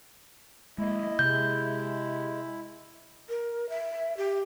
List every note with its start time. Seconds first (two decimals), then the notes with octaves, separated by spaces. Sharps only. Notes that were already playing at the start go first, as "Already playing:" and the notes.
0.78 G#3 A#3 E4 D#5
1.19 C3 G#3 G6
3.29 A#4
3.69 E5
4.17 G4